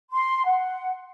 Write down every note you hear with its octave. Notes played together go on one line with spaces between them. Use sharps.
C6
F#5